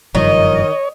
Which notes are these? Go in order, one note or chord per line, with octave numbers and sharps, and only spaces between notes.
F#1 G2 D#3 F3 C#5 D#5